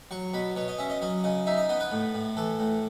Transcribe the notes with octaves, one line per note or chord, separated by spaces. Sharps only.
F#3 C#6
B2 B5
B2 C#5
D#5
C#4 E5
D#5
F#3 D#5
C#3 D#5
D#4 E5
D#5
B3 D#5
B4
A2
A2
E3 A4
A2